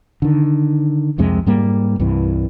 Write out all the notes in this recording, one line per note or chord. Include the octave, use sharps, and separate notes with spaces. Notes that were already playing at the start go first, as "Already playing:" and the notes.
D3 D#3
C2 F2 C3 G#3
G#2 G3 A#3
C2 G2 C3 E3